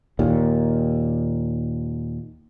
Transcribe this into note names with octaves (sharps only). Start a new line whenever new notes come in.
D#2 A#2